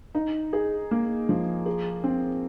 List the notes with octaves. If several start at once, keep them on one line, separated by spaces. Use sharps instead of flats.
D#4
G#4
A#3
F3
G#4
C4